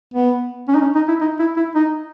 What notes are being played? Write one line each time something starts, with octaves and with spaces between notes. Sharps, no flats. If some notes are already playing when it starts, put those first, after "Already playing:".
B3
C#4
D#4
C#4
D#4
E4
D#4
E4
E4
D#4